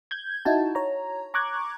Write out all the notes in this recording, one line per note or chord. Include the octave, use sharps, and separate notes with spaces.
G6 G#6
D#4 E4 F#4 A5
C#5 A#5
A#5 C#6 D6 F#6 G#6